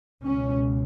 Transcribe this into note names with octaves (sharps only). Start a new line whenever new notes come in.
C#2 B2 C#4